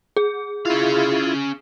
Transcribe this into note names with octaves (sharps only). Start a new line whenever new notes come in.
G#4
C#4 E4 F4 F5